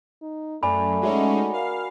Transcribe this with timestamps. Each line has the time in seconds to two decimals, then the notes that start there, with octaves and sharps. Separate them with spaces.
0.22 D#4
0.63 F#2 A3 D5 G#5 B5
1.02 G#3 C#4 D#4 F#4 E5
1.53 A#4 F5